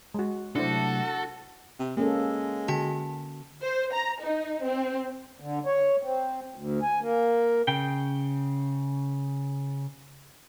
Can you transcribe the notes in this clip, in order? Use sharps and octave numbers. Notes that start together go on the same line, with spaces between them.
G#3 F#4
C3 F#3 A3 D4 E4 F#4 A4 C5
C3
G#3 A#3 C#4 A4
D3 F#4 A5
C5
A#5
D#4
C4
D3
C#5
C4
D2
G#5
A#3
C#3 G5